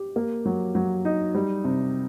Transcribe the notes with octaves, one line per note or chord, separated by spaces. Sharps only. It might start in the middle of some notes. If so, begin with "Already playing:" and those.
Already playing: G4
A#3
F#3
F#3
D#4
G3
C3